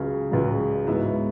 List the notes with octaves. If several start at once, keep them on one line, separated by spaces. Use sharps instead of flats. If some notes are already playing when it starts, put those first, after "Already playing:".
Already playing: C#2 C#3 F#3
C#2 C#3 F#3
G#2 F#3 B3 E4